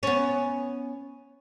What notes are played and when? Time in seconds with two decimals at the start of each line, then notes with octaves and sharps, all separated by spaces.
0.03 B3 C#4